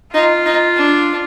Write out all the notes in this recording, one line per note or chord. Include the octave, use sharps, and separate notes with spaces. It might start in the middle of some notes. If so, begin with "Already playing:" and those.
D#4 F4
D#4
D4